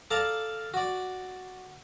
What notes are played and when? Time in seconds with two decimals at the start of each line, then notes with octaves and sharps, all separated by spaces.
0.11 A4 D5 F5 A5 A#5
0.74 F#4 D5